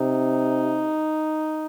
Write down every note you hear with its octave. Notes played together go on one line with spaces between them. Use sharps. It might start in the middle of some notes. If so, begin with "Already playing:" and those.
Already playing: C3 D#4